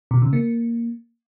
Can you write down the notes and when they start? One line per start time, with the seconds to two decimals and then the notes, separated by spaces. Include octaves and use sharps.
0.11 B2
0.22 C#3
0.33 A#3